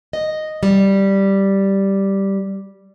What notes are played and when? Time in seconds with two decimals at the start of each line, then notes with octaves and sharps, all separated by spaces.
0.13 D#5
0.63 G3